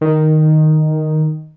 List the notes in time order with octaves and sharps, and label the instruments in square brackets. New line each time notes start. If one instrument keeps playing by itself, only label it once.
[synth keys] D#3